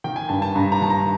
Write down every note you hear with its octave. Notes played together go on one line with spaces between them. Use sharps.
D#3 G5
G#5
G2 A5
A5
G2 A#5
A#5
D#3 A5
A#5